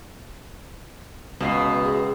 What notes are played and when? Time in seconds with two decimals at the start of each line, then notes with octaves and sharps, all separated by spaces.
1.40 C#2 B2 F5 C7
1.83 G#4